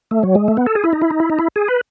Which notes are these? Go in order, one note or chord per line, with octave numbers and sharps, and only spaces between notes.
A3
F#3
G#3
A3
B3
A4
G#4
E4
D#4
E4
D#4
E4
D#4
E4
G#4
B4